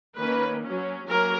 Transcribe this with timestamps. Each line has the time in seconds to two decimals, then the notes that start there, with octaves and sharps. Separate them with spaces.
0.18 D#3 A#3 C#4 B4
0.63 F#3 C#4
1.08 F#3 A#3 C#4 A#4